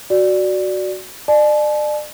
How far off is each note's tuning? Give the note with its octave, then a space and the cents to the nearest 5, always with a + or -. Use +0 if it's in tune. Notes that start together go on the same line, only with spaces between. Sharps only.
F#4 +0 D5 +0
D5 +35 A5 -45